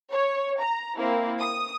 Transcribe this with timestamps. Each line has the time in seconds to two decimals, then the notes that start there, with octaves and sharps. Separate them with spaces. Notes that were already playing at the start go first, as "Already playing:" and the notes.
0.12 C#5
0.60 A#5
0.98 A#3 C4 E4
1.41 D#6